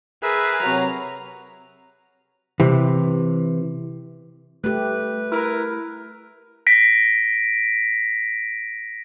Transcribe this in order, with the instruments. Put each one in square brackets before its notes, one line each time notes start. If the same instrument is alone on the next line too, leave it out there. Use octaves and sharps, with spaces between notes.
[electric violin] G#4 [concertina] A#4 E5 E6 [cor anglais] B4
[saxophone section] C3 F#3 [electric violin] A#5
[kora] C3 [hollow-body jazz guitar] E3
[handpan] A3 G4 [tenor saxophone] B4
[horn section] E4 A#4
[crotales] A#6 B6 D7